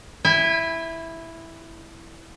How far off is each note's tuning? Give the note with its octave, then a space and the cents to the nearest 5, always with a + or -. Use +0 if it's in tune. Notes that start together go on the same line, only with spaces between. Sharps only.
E4 +0 G#5 -45